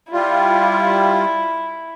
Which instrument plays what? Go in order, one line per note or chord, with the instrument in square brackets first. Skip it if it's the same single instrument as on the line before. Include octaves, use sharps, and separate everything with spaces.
[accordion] G3 F4 [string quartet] E4